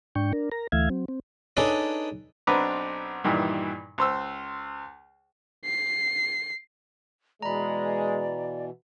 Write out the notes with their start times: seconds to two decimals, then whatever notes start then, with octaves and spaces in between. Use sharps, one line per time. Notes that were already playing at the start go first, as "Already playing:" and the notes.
0.15 G#2 D4 G5 C#6
0.33 D4 A#4
0.52 A#4 A#5
0.72 D2 E3 A3 E5 F5 G#6
0.90 F#3 C4
1.08 C4
1.57 D4 D#4 G#4 A4 B4 C#5
2.47 B1 C4 D4 B4 A#5 D6
3.24 G2 A#2 D#3 E3
3.98 C#2 C5 E6
5.65 C7
7.42 B2 E3 G#3 D5 A#5 B5